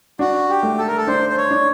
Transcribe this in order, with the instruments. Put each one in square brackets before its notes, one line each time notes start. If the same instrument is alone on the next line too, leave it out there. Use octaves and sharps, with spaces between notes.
[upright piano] D4 [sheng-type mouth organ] F#4
[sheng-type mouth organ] G4
[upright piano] A3
[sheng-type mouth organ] A4
A#4
A4
[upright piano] D4 [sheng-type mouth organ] C5
[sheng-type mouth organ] C5
C#5
[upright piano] D4